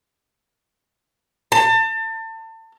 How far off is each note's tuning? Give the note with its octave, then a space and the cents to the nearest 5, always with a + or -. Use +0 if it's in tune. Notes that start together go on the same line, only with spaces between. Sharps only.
A5 +30